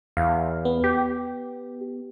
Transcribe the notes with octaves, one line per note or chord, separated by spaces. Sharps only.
E2 F5
B3
G4